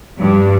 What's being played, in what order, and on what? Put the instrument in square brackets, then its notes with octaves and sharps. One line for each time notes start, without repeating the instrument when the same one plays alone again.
[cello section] G2